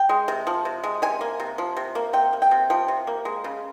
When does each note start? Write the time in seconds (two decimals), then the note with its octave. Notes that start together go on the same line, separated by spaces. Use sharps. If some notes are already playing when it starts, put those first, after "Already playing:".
Already playing: G5
0.09 G#3
0.28 C3
0.47 F3
0.65 C3
0.84 G#3
1.02 C3 G#5
1.21 A#3
1.40 C3
1.58 F3
1.77 C3
1.95 A#3
2.13 C3 G5
2.33 A#3
2.42 G5
2.51 C3
2.70 F3 G5
2.88 C3
3.07 A#3
3.25 G#3
3.44 C#3